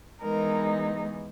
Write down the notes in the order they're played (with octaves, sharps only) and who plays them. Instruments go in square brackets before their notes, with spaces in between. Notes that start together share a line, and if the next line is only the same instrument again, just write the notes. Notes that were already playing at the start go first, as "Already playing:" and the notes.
[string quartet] E3 G#3 B3 D#4 A#4